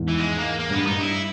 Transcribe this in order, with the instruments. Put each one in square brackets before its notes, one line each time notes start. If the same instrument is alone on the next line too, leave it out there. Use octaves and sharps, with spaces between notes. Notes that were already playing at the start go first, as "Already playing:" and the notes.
Already playing: [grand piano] E2 G#2
[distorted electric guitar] E3
G#3
A#3
A#3
[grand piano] G2
[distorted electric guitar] B3
[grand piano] G2 [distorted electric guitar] D#4
[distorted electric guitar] E4